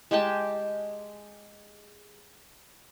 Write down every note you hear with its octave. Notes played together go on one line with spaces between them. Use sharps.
G#3 G4 G5 A5